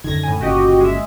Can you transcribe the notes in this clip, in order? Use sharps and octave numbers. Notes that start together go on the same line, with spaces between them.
F#2 D3 D#3 G#6 A#6
A2 G#5
G1 A#2 C#3 F#4 G4 D#5
G#3 E5